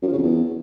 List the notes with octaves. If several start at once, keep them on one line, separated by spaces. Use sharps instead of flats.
F#2
F3
C#3
F2
E2